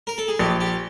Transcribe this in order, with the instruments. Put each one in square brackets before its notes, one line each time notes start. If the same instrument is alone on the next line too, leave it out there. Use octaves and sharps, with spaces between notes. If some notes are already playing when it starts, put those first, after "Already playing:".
[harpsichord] A#4
A4
G#4
[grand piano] A#1 [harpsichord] G4
[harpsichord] G4